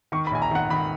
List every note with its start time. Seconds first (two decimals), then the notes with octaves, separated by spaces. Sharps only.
0.12 D#3 C#6
0.27 B5
0.31 A#1 G#5
0.42 A#5
0.51 D#3 F#5
0.70 D#3 B5